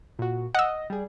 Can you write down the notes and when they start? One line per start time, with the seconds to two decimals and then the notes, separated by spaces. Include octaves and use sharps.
0.19 A#2 F#4
0.55 D#5 F#5 E6
0.90 G3 G#4